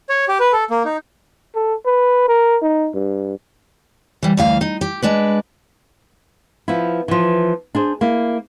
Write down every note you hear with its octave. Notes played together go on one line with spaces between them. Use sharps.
C#5
G4
B4
A4
A#3
D#4
A4
B4
A#4
D#4
G2
E3 G3
D2 E3 F5
D#4
G4
G#3 D4 B4
F3 B3 E4
E3 F3
D4 G#4 C5
A#3 E4